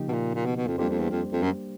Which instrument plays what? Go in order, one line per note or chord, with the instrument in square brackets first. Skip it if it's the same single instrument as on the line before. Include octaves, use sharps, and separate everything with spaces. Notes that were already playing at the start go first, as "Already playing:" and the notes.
Already playing: [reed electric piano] C#3 F3 A#3 D#4 G4
[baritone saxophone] B2
A#2
A#2
B2
B2
F2
[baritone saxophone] F2 [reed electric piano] G3 A#3 D4 G4 C5
[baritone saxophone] F2
E2
F2
F2
F#2